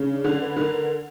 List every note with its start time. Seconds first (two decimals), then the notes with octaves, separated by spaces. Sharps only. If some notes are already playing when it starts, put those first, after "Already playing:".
Already playing: C#3
0.09 D4
0.24 D3 D4
0.41 B4
0.56 D3 A#4